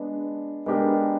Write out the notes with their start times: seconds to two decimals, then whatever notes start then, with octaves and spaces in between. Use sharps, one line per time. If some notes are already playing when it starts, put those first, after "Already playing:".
Already playing: G#3 B3 D4
0.66 G#3 B3 D4 G4 A#4